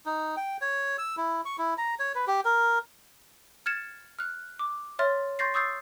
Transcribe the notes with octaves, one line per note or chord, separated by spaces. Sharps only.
D#4
G5
C#5
E6
E4
C#6
E4
A#5
C#5
B4
G4
A#4
F6 G#6 A6 C#7 E7
F6 F#6
D6
C#5 E5 C6 F6 A6
C6 C#6 G6 A6 A#6 C7
C#6 D#6 E6 G6 A6 C7